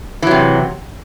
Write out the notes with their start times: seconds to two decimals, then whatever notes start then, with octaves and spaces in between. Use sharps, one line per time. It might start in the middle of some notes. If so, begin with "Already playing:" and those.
0.22 E3
0.27 F#3
0.31 C3